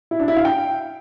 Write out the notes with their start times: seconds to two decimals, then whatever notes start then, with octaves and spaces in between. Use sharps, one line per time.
0.11 E4
0.20 D4
0.28 E4
0.36 F5
0.45 G5